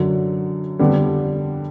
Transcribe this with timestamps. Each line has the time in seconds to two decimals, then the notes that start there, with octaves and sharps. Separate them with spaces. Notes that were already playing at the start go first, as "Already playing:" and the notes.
Already playing: F#2 D3 F#3
0.79 F2 D3 G3 B3